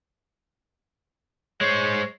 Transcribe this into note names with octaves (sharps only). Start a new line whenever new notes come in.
G#3 C5 C#5